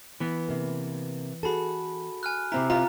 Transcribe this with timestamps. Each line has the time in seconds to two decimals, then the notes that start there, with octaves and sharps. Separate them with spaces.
0.20 E3 B3
0.49 C3 A#3
1.43 F#4 G#4 A4 A5 B5
2.23 G#5 F6 F#6
2.52 C3 C4 E4 A#5
2.70 F4 A#5